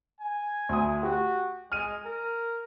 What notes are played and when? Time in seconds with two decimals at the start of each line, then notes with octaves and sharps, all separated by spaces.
0.20 G#5
0.69 D2 D#6
1.03 F#4 G4
1.72 G#3 F6 D#7
2.06 A#4